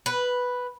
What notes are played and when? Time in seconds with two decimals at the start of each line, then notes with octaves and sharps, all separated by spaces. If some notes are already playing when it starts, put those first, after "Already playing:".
0.06 B4